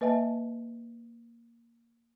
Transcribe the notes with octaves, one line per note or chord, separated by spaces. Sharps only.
A#3 B4 D#5 E5 G#5 A5